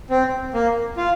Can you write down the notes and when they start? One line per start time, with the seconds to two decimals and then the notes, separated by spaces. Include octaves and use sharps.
0.10 C4
0.54 A#3
0.97 F4